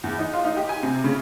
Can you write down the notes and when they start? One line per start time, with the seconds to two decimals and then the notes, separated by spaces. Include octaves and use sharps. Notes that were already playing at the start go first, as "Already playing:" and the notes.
0.04 E2
0.19 D#4
0.33 F4
0.45 D#4
0.57 G4
0.69 G#5
0.83 C3
1.04 C#3